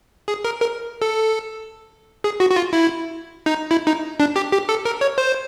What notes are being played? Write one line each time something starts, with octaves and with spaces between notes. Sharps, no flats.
G#4
A#4
A#4
A4
G#4
F#4
F#4
F4
E4
D#4
E4
D#4
D4
G4
G4
A4
A#4
C#5
C5